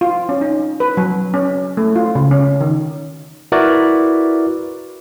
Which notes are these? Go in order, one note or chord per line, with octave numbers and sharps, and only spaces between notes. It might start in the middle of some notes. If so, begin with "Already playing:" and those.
F4
C#4
D#4
B4
F#3
C#4
A3
F4
C#3
C#4
D#3
E4 F#4 A#4 B4 D5